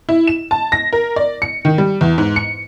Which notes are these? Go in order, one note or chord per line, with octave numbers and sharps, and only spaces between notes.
E4
E7
A5
A#6
A#4
D5
C#7
D#3
G3
E2
G#2
C#7